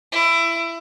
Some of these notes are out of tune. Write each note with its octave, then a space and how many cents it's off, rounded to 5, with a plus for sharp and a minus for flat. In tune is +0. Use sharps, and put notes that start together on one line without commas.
E4 +20